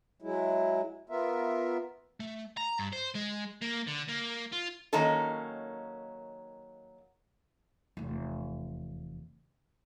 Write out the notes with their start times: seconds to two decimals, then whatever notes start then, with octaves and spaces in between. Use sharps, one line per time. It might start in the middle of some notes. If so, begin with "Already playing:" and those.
0.22 F#3 G#3 E4
1.09 B3 F4 A#4 E5
2.20 A3
2.57 A#5
2.79 G2
2.93 C5
3.15 G#3
3.62 A#3
3.87 D3
4.09 A#3
4.53 F4
4.93 D#3 F#3 A#3 C#4 D#4 A4
7.97 F1 E2